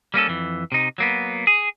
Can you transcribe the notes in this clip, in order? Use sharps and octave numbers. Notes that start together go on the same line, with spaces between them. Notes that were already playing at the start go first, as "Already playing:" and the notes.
G3 A#3 C#4 A4
F2 E3
C3 D#4
F#3 A#3 B3
G#4